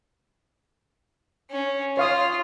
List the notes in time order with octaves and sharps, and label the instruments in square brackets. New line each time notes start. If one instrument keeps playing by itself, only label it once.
[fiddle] C#4
[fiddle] F4 [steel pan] C#5 F5 D#6